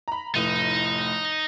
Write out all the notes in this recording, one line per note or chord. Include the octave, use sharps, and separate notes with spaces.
A#5 B5
F1 A2 D#4 D#7